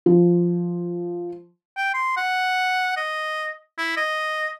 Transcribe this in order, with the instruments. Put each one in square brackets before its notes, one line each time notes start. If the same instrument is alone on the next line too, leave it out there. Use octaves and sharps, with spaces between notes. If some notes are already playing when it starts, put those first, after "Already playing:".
[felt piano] F3
[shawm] G5
C6
F#5
D#5
E4
D#5